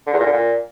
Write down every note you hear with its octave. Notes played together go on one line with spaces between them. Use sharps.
D3
E2
A#2
D3
A#2